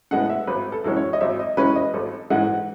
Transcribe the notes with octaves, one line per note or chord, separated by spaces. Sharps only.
A2 G#3 B3 F#5
E5
G#1 B4
A4
F#2 E3 G#3 C#4
C#5
D#5
G#1 E5
D#5
F#2 E3 G#3 C#4 B4
D#5
G#1 A4
G#2 E3 G#3 F#5